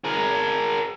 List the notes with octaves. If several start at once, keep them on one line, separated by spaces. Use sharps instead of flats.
G#4 A#4